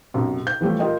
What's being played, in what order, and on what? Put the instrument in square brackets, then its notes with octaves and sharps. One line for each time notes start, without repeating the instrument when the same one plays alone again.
[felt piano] B1 F#2 C3
G6
E3 F3 G3 A3
F4 G4 A#4 D#5 G5